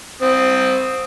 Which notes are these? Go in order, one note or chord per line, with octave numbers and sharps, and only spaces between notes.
C4 D#6